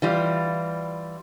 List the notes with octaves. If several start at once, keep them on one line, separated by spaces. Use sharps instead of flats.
E3 G3 F4